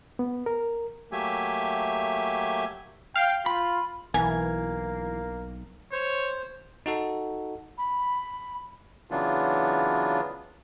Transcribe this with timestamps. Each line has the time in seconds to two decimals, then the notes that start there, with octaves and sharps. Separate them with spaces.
0.19 B3
0.46 A#4
1.12 F#3 A3 A#3 G4 E5 G#5
3.16 F5 G5
3.46 F4 B5
4.14 B1 E3 A#3 G#5
5.92 C5 C#5
6.86 D#4 F#4 A4
7.78 B5
9.11 C#3 E3 F#3 B3 D4 F4